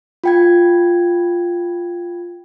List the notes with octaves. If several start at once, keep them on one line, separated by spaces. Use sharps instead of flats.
F4 G5 G#6